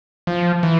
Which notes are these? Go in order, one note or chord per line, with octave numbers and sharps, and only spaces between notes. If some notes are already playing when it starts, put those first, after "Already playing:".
F3
E3